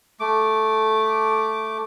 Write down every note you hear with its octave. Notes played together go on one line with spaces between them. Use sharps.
A3 D6